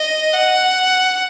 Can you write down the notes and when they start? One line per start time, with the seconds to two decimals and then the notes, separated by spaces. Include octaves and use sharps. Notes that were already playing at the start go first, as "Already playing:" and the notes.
Already playing: D#5
0.33 F#5